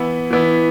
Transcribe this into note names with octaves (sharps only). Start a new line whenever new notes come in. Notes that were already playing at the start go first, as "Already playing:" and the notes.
Already playing: E3 B3 E4
E3 B3 E4